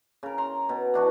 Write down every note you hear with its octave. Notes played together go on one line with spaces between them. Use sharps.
C#3 A#4
A#5 C6
B2
E3 D4 F#4